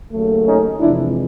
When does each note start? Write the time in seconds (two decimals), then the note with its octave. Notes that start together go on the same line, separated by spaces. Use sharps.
0.12 D#2 C#3 F#3 A3
0.46 C#4 D#4
0.80 F2 C3 E3 G#3 D4 E4